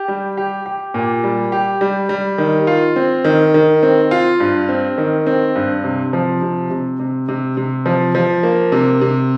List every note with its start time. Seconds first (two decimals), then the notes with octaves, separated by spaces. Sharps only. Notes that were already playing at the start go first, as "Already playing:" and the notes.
Already playing: G4
0.08 G3
0.37 G4
0.66 G4
0.94 A#2
1.24 G3
1.52 G4
1.81 G3
2.09 G3
2.38 D#3
2.67 F4
2.96 C4
3.24 D#3
3.54 D#3
3.83 C4
4.11 F4
4.40 G2
4.69 C4
4.98 D#3
5.26 C4
5.55 G2
5.84 C3
6.13 F3
6.42 C3
6.71 C3
7.00 C3
7.29 C3
7.57 C3
7.86 F3
8.15 F3
8.43 A#3
8.72 C3
9.01 C3